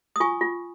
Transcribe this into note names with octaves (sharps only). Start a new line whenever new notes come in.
D#6
F4 G#5 C#6
F4